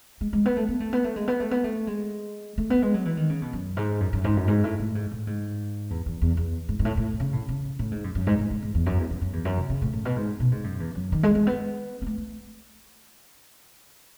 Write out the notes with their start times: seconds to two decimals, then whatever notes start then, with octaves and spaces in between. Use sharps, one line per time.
0.21 G#3
0.33 G#3
0.46 B3
0.57 A3
0.68 B3
0.80 A3
0.93 B3
1.04 A3
1.16 G#3
1.28 B3
1.40 A3
1.51 B3
1.64 A3
1.87 G#3
2.58 A3
2.70 B3
2.82 G#3
2.94 F#3
3.05 E3
3.17 D#3
3.29 C#3
3.42 B2
3.53 F#2
3.77 G#2
4.00 F#2
4.13 F#2
4.24 G#2
4.36 F#2
4.48 G#2
4.64 A2
4.79 A2
4.95 G#2
5.11 A2
5.27 G#2
5.90 E2
6.06 E2
6.22 E2
6.37 E2
6.69 G#2
6.79 G#2
6.85 A2
6.97 A2
7.20 C#3
7.33 A2
7.49 C#3
7.79 A2
7.91 G#2
8.04 F#2
8.15 F#2
8.27 G#2
8.39 G#2
8.51 G#2
8.63 G#2
8.75 E2
8.86 F#2
8.98 E2
9.10 F#2
9.21 F#2
9.33 E2
9.45 F#2
9.57 C#3
9.70 C#3
9.82 A2
9.93 A2
10.05 B2
10.17 G#2
10.40 B2
10.52 G#2
10.64 F#2
10.80 E2
10.95 F#2
11.12 D#3
11.23 G#3
11.35 G#3
11.47 B3
12.02 B3
12.07 A3
12.18 A3